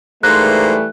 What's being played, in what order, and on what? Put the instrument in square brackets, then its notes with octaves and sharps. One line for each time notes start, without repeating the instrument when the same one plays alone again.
[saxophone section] G#2 A#3 C5 [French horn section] E3 G3 A3 [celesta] F#6